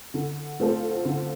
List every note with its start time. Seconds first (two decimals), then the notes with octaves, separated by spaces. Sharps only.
0.14 D3
0.59 A3 C4 F4 A4
1.05 D3